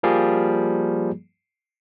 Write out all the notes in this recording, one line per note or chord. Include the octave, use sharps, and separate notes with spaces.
F3 G3 A#3 G#4